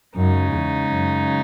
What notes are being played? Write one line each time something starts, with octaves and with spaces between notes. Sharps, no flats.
F#2 C#3 G#3 D#4
E2
F#2